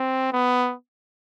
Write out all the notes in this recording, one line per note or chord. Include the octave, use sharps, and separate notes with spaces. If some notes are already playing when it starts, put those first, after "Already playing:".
Already playing: C4
B3